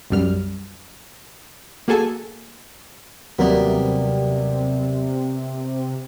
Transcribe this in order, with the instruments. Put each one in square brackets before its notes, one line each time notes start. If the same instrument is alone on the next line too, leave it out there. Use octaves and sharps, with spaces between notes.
[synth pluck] B1 F#2 G3 F6
A#3 F#4 G#4 A4 G#5 A5
[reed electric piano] D#2 F#3 A#4 [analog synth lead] C3 [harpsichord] G3 A#3 B3